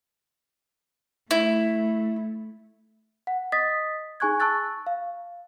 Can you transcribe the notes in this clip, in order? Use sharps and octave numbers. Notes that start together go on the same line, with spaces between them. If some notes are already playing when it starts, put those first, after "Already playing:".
A3 E4
F#5
D#5 D#6 A6 B6
D#4 G#4 G#5 C#6 F#6 G#6
A5 C#6 E6 F#6 A6
F5